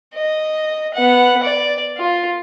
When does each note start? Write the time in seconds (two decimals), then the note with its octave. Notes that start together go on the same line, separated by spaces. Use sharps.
0.15 D#5
0.94 B3 F#5
1.43 D5
1.97 F4